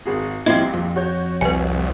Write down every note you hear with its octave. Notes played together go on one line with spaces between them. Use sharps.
G#1 F#4 G#4
A#1 A#2 F3 G3 C4 E4 D#5
F2
F#4 C#5 G6
C2 B4 G#5